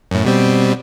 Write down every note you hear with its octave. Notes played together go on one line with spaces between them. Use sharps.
F#2 A2
B2 G3 C4